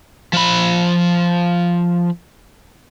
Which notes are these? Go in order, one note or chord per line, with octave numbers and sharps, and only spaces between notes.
F3 B5